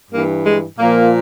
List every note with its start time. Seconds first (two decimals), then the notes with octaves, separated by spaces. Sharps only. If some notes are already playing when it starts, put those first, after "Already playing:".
0.11 G2 E3 A#3
0.45 G#3
0.79 A#2 F3 A#3